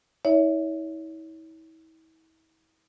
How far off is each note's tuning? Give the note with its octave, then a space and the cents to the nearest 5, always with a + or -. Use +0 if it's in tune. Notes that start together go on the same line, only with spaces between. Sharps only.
E4 -40 C#5 +30 E5 -10